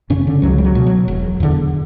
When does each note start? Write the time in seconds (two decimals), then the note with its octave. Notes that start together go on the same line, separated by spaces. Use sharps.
0.10 F#2 C#3 C#4
0.27 D3
0.42 C#2 F#3
0.58 G3
0.64 F#3
0.75 B2
0.86 F#3
1.08 E1
1.40 E2 D3